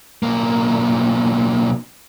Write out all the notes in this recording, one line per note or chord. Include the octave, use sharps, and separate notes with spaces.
B1 A#3